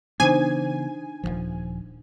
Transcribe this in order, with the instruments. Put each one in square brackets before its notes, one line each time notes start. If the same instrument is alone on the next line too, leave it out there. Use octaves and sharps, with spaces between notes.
[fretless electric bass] C#3 E3 B3 [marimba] D4 D#4 C5 [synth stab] G#5
[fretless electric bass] D#1 C2 F3